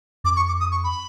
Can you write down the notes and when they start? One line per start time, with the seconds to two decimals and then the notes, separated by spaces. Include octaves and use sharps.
0.24 F2 D6
0.36 C#6
0.48 D6
0.60 D#6
0.71 C#6
0.84 B5